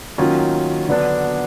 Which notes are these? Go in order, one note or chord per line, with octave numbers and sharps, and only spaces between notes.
D#3 F#3 A#3 C#4 F4
D3 F#3 B3 D4